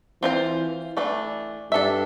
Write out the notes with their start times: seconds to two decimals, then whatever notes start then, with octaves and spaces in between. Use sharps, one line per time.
0.22 E3 C4 F4 C5
0.97 E3 A3 D4
1.71 G2 D4 A4 E5